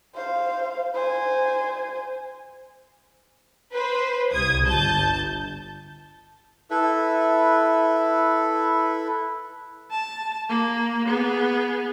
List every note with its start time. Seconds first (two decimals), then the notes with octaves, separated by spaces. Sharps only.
0.14 C5 F5
0.94 C5 G#5
3.72 B4 C5
4.31 C2 D#6 G#6
4.65 G1 A5 G6
6.71 E4 A4 B4 E5
9.91 A5
10.49 A#3
11.07 B3 G#4